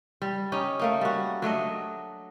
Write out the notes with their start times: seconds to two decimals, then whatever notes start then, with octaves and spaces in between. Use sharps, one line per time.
0.22 G3
0.52 C#4 D#4 G4
0.79 A3 A#3 D#4
1.01 G3 F#4
1.42 F#3 A3 D4 D#5